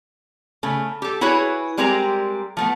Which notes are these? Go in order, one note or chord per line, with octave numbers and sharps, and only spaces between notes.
C#3 A3
G4 A4
E4 F#4 G#4 B4 C#5
G3 G#3 C4 G4 A#4 A#5
F3 A3 B3